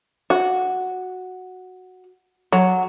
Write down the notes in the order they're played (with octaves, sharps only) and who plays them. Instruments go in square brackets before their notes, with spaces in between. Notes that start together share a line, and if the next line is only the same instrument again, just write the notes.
[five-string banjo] F#4
F#3